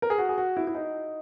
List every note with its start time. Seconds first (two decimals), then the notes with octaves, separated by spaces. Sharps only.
0.02 A#4
0.10 G#4
0.18 F#4
0.29 G#4
0.38 F#4
0.57 E4
0.67 E4
0.75 D#4